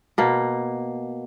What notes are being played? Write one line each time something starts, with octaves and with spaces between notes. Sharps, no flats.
B2 A#3